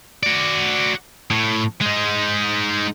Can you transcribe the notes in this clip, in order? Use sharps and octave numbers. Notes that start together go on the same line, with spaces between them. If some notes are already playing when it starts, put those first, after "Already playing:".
F#4 D5
A2
G#3 D#4